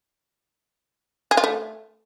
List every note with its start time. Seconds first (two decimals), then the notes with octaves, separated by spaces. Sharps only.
1.31 G#4
1.37 F4
1.44 A3